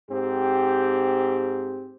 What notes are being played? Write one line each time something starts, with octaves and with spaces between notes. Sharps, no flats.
G#2 C4 G4